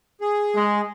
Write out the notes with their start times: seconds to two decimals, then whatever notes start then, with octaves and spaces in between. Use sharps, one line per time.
0.21 G#4
0.54 G#3